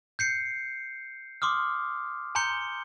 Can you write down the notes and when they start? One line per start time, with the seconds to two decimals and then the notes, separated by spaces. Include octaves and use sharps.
0.19 G6 C7 C#7
1.42 C6 D6 D#6 F6
2.35 G#5 A#5 C6 G6 C#7 G7